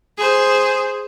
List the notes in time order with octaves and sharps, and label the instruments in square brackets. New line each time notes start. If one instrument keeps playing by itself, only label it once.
[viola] G#4 C5